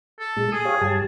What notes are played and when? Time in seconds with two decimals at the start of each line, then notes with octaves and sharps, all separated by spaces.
0.19 A4
0.37 A#2 G#3
0.52 G#4 D#6
0.65 G4 C#5 F5
0.81 G2 G4 A5